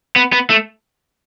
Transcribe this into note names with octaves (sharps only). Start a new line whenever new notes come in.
B3
B3
A3